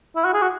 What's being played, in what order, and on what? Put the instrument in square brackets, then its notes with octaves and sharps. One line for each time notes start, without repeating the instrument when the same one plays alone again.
[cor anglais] E4
F#4
G#4
F#4